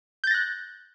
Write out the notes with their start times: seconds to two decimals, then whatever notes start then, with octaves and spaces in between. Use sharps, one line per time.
0.24 G6
0.27 A6
0.31 A#6
0.34 F#6